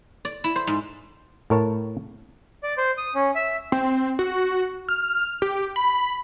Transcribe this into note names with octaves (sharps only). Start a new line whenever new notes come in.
D5
E4
C5
G#2
A2 A#4 C#5 A5
D5
C5
D#6
C#4
E5
C4
F#4
F6
G4
B5